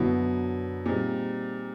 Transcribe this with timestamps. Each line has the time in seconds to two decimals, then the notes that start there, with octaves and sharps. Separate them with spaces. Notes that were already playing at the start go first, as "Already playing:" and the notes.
Already playing: F#2 B2 D3 F#3 B3 E4
0.86 A#2 G3 C4 D#4 G#4